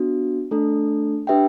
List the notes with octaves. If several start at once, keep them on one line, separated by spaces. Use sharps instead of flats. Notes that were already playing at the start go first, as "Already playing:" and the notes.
Already playing: B3 D4 F#4
A3 D4 A4
D4 G4 B4 E5 G5